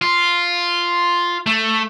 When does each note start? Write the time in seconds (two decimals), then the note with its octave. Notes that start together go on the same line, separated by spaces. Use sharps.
0.02 F4
1.46 A3